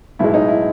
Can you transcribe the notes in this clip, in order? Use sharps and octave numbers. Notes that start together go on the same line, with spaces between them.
B1 A2 G#3 E4
D#4
E4